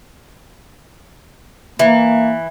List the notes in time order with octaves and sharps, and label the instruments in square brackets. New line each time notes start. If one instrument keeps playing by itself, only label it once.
[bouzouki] E3 [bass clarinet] A#3